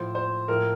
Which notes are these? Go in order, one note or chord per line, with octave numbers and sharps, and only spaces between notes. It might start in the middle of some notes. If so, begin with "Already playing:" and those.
Already playing: A2 F3 C5
C5
A2 F3 A#4